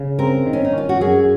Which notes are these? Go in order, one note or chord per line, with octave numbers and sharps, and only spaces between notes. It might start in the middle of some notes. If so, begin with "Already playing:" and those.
Already playing: C#3
C4 A#4
D#3
C#4
D#4
C#4 F4
F#4
F#2 G#4